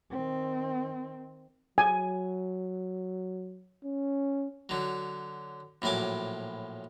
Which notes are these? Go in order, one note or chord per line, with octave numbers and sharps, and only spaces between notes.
D#3 C4
F#3 G#5
C#4
D3 F#3
A#1 A2 F#3 G#5 D6